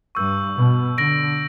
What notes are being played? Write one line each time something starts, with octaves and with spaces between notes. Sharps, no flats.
G2 C#6 E6 G6
B2
D3 A#6 D7 F#7